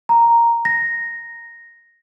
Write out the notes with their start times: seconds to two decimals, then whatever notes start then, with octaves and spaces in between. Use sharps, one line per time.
0.09 A#5
0.65 A#6